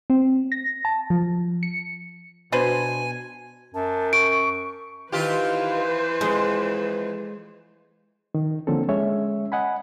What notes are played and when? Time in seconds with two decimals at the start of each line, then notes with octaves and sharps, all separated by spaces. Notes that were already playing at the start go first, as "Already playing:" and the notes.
0.10 C4
0.52 A#6
0.85 A5
1.10 F3
1.63 C#7
2.52 B2 D4 B4 C5 G#5
3.74 F#2 A5
4.13 C#6 D7
5.12 D#3 E3 F4 G4 B4 C5
6.21 F2 G#3
8.35 D#3
8.67 D3 F3 A#3 C4 C#4 A4
8.89 G#3 C#4 C#5 E5
9.52 D#5 F#5 G#5 B5